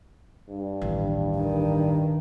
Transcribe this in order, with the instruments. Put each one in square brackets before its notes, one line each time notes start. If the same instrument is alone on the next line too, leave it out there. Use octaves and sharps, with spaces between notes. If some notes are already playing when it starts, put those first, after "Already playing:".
[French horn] G2
[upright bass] A1 D#2
[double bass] D#3